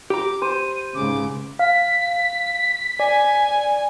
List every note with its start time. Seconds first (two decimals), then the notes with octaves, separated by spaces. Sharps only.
0.10 G4 G5 A#5 D6
0.42 C5 D#7
0.95 C#2 G#2 C#3 D6
1.59 F5 B6
3.00 D5 G#5